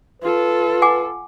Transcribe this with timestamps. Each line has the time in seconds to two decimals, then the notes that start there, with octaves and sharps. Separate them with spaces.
0.22 F4 A4 B4
0.82 F#5 G#5 D6